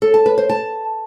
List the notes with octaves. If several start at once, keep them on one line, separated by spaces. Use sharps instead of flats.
A4
A5
B4
C5
A5